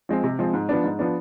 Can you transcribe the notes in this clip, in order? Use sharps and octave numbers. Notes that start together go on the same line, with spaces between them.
F3 G#3 C4
C3
F3 G#3 C4
G#2
F3 B3 D4
G#2
F3 B3 D4